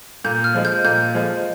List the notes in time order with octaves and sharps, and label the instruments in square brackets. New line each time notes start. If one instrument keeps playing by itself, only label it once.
[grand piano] A#2 [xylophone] G6
[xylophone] F6
[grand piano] F3 G#3
[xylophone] G6
[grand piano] A#2 [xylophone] G6
[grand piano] F3 G#3